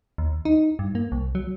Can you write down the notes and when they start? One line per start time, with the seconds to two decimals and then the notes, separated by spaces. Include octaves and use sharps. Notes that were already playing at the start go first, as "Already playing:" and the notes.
0.18 D#2
0.45 D#4
0.79 G2
0.95 A#3
1.12 C2
1.35 F#3